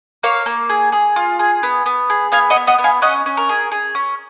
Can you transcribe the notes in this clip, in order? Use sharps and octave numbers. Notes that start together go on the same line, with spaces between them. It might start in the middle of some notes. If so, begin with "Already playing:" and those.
A#3 C#5 F5
A#3
G#4
G#4
F4
G#4
B3
B3
G#4
B3 F5 G#5
D#5 F#5
B3
D#5 F#5
B3
F5 G#5
C#4 D#5 F#5
C#4
A#4
G#4
G#4
C#4